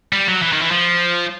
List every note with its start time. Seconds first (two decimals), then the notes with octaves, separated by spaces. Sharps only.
0.13 G3
0.28 F#3
0.42 E3
0.53 D#3
0.62 E3
0.71 F3